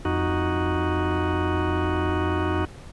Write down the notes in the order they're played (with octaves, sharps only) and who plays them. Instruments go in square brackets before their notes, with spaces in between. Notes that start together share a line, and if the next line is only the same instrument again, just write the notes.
[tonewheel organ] F2 D#4 F#4